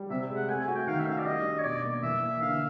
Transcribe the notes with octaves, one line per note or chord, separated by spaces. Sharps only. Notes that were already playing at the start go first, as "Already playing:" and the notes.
Already playing: G3
C3 E5
G#3
F#5
A3 G#5
G#5
F#4
G5
D#3 F5
E5
C#4 F5
D5
G3 D#5
D4
C#5
B2 D5
A#3
E3 E5
A#3
D3 F5